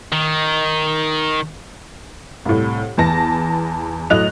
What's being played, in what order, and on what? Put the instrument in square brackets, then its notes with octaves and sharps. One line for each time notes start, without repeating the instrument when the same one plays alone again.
[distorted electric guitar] D#3
[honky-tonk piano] C2 A2
E2 B3 A5 A#6
A2 F#3 D#5 F#6 F7